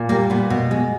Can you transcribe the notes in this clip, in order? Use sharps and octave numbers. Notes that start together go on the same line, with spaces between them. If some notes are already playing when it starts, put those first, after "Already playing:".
Already playing: A#2
G3 A#3
A#2 B3
B2
G#3